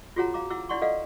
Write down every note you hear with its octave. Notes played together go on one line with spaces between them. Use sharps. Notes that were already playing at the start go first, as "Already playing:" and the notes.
F4 F#4 G#4 C#5 F#5 A#5
F5 A#5 D6
E4 F#5 D6 E6
D4 E4 D5 F#5 C6 C#6
A4 B4 D5 D#5 F5 F#5